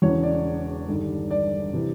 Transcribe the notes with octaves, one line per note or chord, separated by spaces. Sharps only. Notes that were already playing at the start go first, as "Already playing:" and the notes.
E1 E2 C#3 E3 C#5
D5
G1 G2 D#3 G3
D5
C3 E3 G3